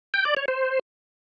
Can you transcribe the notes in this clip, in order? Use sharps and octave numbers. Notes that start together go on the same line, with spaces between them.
G5
D5
C#5
C5